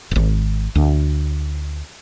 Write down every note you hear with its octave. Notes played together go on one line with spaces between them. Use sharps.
D1 G#1
D2